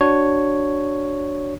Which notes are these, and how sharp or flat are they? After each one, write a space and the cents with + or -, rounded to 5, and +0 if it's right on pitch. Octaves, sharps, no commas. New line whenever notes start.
D4 +0 F#4 +15 C#5 +0